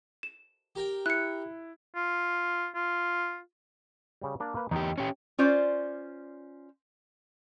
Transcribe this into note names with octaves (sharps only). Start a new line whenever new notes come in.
E7
G4 A#4 G5
E4 F#6 C#7
F4
F4
C#3 G3
A#3 D4 A#4
A#3 B4
E2 D#4 G4 G5
C#4 G4
C#4 F4 C5 D5